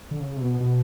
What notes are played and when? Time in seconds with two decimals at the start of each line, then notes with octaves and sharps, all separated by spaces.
0.11 D3
0.20 C#3
0.37 C3
0.41 B2
0.60 B2